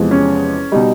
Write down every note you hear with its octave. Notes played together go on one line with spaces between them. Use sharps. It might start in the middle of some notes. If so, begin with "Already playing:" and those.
Already playing: E2 C3 F3 G#3
C#4
B2 G3 D#4